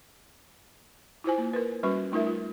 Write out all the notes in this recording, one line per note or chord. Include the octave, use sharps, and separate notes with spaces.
E4 F4 C5 G#5
A#3
A#4 B4
G3 C#4 F#4 B4 C#6
A3 D#4 F4 A#4 E5
F4